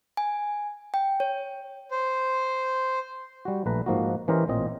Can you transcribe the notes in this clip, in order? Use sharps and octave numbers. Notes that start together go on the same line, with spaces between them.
G#5
G5
C#5
C5
G3 F#4
A#1 A3 B4 A#5
G#2 F3 A#3 D#4 F#4
E3 C#4 G4 A#4 C5 D#5
A1 A#2 C4 D#5